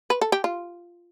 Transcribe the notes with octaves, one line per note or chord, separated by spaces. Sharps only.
B4
A4
G4
F4